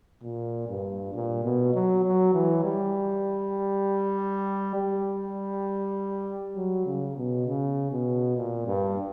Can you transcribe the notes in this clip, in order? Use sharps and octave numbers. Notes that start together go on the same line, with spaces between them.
A#2
G2
A#2
B2
F#3
F#3
E3
G3
G3
F#3
C#3
B2
C#3
B2
A#2
G2